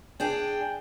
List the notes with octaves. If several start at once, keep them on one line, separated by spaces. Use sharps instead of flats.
D4 G#4 G5